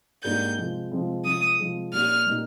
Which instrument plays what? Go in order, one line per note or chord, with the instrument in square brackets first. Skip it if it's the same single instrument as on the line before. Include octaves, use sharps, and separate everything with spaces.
[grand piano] G#2 G3 A#3 D4 G4 [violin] G6
[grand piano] C3 F3 G#3 C4
C3 F3 G#3 C4
[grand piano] C3 F3 G#3 C4 [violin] D#6
[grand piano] C3 F3 G#3 C4
[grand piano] A#2 G3 A#3 D#4 G4 [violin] F6
[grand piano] A#2 G3 A#3 D#4 G4